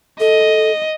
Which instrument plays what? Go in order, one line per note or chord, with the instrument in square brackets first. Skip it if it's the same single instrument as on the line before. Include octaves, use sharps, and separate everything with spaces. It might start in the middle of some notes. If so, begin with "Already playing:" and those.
[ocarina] A4 [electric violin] D#5